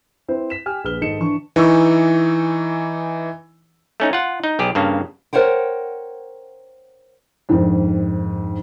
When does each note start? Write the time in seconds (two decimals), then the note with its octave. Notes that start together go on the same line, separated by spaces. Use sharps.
0.28 C4 E4 B4 C5
0.50 B6 E7
0.66 G4 G#5 F6
0.84 A#1 G#4 B4 F6 G7
1.01 G#2 D#3 A4 D#5 C#7 E7
1.19 D3 E3 D4 C#6
1.56 E3 D#4 C#6 E6
4.00 A3 C#4 D#4
4.13 F4 F#5
4.44 D#4
4.59 B1 G4 G#4
4.75 G2 C#3 A#3
5.33 A#4 C5 C#5 F#5 G5
7.49 F2 G#2 D3 D#3